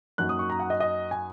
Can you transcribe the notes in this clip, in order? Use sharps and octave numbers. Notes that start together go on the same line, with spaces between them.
F#2 F#3 A#3 D#4 F#6
D#6
C#6
A#5
F#5
D#5
D#5
G#5